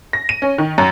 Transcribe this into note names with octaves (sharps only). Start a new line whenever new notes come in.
A#6
D#7
C#4
D#3
F#2